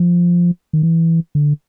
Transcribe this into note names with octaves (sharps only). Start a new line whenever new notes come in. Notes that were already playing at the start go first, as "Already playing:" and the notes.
Already playing: F3
D#3
E3
D3